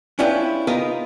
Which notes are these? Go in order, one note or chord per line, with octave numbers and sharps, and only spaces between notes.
C#4 D4 E4 F4 G4 B4
B3 D#4 F4 A#4 B4